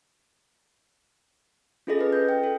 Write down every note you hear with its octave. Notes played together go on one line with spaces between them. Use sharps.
C#4 F4 G#4 A4 D#5 A#6
B4 D#5
G6
G5
A4